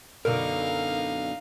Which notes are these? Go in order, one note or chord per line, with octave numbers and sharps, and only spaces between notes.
F#2 B2 D3 D#4 A#4 F5